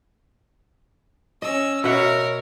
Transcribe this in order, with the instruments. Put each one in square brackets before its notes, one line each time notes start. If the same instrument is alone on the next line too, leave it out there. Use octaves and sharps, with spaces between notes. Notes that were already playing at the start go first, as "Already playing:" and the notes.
[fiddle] C#4 E6 [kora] D#5
[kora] B2 E5 F#5 [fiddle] A#4 C#5